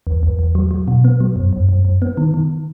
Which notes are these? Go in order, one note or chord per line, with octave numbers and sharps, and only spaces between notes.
E2
E2
E2
F#3
F#3
B2
B3
F#3
F#2
F#2
F#2
F#2
B3
D#3
D#3